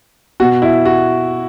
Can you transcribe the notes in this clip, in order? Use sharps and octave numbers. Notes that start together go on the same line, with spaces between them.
B2 F#4
E4
F#4